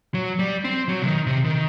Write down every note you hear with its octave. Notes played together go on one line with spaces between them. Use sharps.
F#3
G3
C4
F#3
C3
D#3
C3
D#3